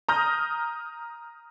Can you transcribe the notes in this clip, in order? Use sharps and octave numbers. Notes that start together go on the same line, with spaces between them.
A#5 D#6 F6 G6 A#6